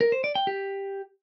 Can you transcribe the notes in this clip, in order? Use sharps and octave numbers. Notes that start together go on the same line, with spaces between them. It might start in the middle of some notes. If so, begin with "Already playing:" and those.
A#4
C5
D5
G5
G4